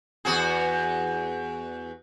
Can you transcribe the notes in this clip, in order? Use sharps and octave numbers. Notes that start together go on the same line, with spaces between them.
E2 F#4 G#4